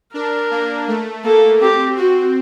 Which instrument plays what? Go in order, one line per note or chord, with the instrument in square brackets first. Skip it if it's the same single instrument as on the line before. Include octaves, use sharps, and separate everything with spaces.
[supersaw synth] D4 [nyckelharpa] A#4
[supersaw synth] A#3
A3
[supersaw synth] A#3 [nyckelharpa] A4
[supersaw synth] C4 [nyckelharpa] G4
[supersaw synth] C4 [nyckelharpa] F#4